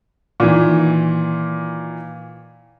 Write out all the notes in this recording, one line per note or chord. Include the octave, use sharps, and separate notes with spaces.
A#2 D#3 E3